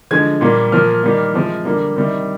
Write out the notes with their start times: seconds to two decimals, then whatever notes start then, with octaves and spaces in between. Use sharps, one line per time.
0.11 D3 F3 G#3 G#6
0.41 A#2 G3 A#3
0.72 A#2 F3 A#3 F6
1.03 D#3 G3 A#3
1.34 C3 F3 G#3
1.65 D3 G3 A#3
1.96 C3 D#3 G3